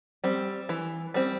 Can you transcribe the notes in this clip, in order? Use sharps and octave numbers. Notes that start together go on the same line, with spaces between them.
G3 C4
E3
G3 C4